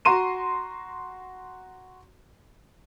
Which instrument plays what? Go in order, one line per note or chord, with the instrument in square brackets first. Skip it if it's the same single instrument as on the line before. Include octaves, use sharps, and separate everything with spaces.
[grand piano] F#4 A#5 C6 D#7 E7